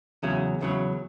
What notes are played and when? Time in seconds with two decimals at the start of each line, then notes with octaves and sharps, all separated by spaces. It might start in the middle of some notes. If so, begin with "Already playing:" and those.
0.23 E2 C#3 F#3
0.61 E2 C#3 F#3